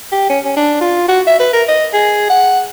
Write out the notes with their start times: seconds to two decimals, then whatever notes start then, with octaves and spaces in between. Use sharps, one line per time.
0.12 G4
0.30 C#4
0.45 C#4
0.57 D4
0.81 F4
1.08 F#4
1.27 E5
1.40 B4
1.53 A#4
1.68 D#5
1.93 G#4
2.30 F#5